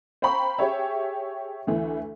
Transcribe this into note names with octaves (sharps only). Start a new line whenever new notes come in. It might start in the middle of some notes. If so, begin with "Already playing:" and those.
C5 F5 G5 A#5 B5 C#6
G4 G#4 C#5 E5
D2 D3 E3 A3